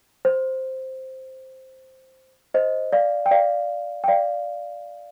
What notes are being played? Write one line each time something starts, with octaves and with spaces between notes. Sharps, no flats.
C5
C5 D#5
D5 F5
G5
D5 F5
G5
D5 F5